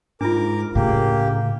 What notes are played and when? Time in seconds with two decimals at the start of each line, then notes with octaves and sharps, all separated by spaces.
0.21 G#2 D4 F4 A#4 D6
0.75 A2 C#3 A#3 G4